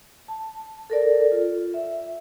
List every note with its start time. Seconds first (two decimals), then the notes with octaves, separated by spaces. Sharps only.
0.28 A5
0.90 A4 A#4 D5
1.32 F4
1.74 E5